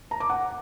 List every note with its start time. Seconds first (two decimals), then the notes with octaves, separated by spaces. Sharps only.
0.11 A#5
0.20 D6
0.30 F#5